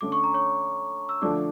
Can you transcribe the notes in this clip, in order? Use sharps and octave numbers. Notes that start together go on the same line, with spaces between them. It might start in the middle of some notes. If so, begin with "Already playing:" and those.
D3 A3 C#4 D6
C#6
A#5
C#5 C#6
E6
D3 F3 A3 D4 D5 D6